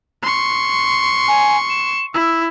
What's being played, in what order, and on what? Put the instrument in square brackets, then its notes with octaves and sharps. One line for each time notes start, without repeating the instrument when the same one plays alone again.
[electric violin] C6 C#6
[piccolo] G#5
E7
[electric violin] E4 [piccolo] E6